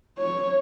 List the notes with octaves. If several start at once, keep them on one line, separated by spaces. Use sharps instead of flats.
C#5